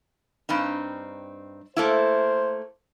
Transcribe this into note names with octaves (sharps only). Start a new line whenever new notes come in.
G2 C4 D#4
A3 A#3 E4 C5